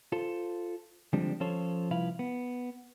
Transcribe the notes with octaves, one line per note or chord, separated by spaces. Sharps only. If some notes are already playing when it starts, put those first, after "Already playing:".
F4 A4 C5
D3 F3 G3 G#3 C4 D4
F3 C#4 F4 A4 C5 C#5
C2 F3 E4 B4 F5 B5
B3